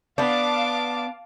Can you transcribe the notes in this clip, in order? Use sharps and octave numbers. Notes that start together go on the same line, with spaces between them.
B3 D4 F5 A5 D6